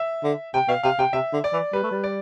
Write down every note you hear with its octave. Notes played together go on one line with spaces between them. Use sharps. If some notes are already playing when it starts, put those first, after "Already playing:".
Already playing: E5
D3
C3 G5
B2 F5
C3 F5
C3 G5
C3 E5
D3
D5
E3
G3 B4
A3
G3
D5